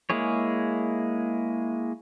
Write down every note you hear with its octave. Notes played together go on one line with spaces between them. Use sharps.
G#3 A#3 E4 G#4 C#5